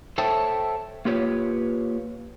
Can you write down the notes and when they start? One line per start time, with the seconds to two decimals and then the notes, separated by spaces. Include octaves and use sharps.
0.18 A4 C5 C#5 E5 G5 A5
1.05 A#3 F4 G4 B4 C#5